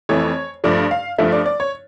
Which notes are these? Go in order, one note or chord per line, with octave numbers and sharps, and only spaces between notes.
F2 E3 A3 C#5
G2 F3 A3 D5
F5
G2 F3 A3 E5
D5
D5
C#5